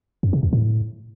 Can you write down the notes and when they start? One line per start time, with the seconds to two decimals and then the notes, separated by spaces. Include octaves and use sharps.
0.23 F#2
0.33 C3
0.43 E2
0.53 A2